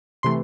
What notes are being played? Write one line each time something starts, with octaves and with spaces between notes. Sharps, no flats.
C3 E3 A3 C6